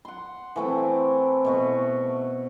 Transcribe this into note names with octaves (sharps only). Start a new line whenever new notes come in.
F#5 C6
E3 A3 C4
B2 A3 F#4